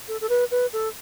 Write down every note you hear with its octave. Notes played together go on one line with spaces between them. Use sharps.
A4
A4
B4
B4
A4